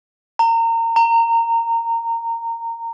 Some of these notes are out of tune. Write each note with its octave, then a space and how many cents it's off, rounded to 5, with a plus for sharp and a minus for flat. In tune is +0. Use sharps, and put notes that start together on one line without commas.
A#5 -30
A#5 -20